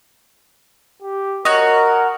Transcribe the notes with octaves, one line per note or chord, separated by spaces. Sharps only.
G4
F#4 A#4 C#5 D#5